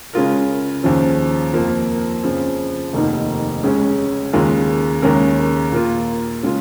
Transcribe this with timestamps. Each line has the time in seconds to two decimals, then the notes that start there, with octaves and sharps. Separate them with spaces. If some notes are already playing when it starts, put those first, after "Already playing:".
0.13 C#3 G#3 F4 A#4
0.83 D#2 C#3 F3 C#4
1.53 F2 F3 A#3 F4
2.24 F2 C#3 F3
2.93 F1 D#2 D#3 A#3 D#4
3.63 C#2 C#3 G#3 C#4
4.33 D#2 C#3 G#3 F4 A#4
5.02 D#2 C#3 G#3 C#4 A#4
5.72 A#2 A#3 F4
6.43 C#3 G#3 F4